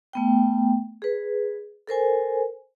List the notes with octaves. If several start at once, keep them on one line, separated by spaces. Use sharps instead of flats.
A3 B3 G5
G#4 B4
A4 A#4 C5 G#5